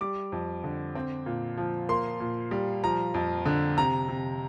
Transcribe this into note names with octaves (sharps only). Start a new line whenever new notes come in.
G3 D6
F2
D3
C4
A#2
F3
A#3 C6
A#2
G3
F3 A#5
F2
D3
C3 A#5
C3